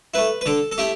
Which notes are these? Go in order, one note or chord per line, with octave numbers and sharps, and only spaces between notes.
A3 E4 B4
B4
D3 A4
A4
A3 E4 G4